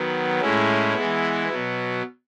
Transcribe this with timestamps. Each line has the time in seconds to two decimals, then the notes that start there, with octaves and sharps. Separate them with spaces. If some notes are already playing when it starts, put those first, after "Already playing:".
Already playing: D#3 F#3 B3
0.42 A2 G#3 C#4 E4
0.94 E3 G#3 B3
1.48 B2 F#3 B3